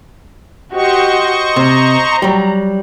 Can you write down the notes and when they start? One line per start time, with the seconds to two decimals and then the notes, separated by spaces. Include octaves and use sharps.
0.74 F#4 G4 C5 D#5 C#6
1.56 C3 A#5
2.22 F#3 G3